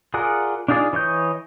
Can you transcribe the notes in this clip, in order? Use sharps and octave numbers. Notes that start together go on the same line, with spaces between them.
F4 G#4 A#4 D5 F#5
D4 D#4 F4 G#4 D5
E3 C#5 D#5 G6